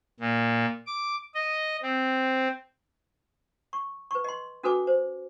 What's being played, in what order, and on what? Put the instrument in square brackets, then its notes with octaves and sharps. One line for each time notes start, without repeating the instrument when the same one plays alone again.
[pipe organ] A#2
D6
D#5
C4
[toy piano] C#6
B4 C#6
D#5 C6
C#4 F#4 A4 B4 G#5 D6
C5